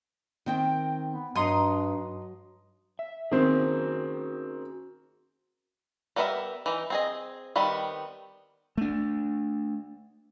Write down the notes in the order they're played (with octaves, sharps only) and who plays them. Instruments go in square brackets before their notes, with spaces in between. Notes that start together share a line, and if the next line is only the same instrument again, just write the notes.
[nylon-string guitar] D#3 C4 G5
[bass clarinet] B3
[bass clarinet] G2 [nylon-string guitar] F#3 [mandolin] D#4 C6 D#6
[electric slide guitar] E5
[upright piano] D#3 C4 [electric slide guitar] C#4 F#4 G#4
[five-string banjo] G3 B3 A#4 C#5 E5
E3 D#4
C4 G#4 D#5
D#3 G3 B3 C4 B5
[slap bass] A3 D4